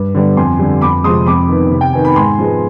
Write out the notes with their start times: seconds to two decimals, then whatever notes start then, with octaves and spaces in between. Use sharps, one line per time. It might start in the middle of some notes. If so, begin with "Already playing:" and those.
Already playing: G2
0.15 D3 G3 B3
0.37 F2 G#5 C6
0.59 D3 G3
0.81 F2 B5 D6
1.04 C3 F3 G#3 C6 D#6
1.26 F2 B5 D6
1.49 D#3 B3
1.71 C3
1.81 G5
1.93 D#3 B3 G#5
2.05 B5
2.16 G#2 G#5 C6
2.39 F3 G#3 B3